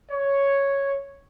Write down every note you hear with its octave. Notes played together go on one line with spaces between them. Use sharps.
C#5